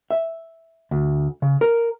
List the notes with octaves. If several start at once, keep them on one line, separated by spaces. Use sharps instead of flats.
E5
D2
C#3
A#4